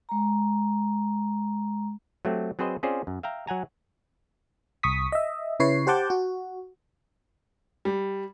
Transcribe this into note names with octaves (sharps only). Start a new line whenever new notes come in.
G#3 A#5
F#3 A3 C4 G4
F#3 C4 G#4 B4 C5 D#5
C4 C#4 F4 G#4 C5 D5
F#2
E5 F5 G5 A#5
F#3 F#5 G#5 A#5
C2 C#6 D#6 B6
D#5 E5
C#3 E4 B4 C#5 C7
G4 C5 F#5 A5 D6 G6
F#4
G3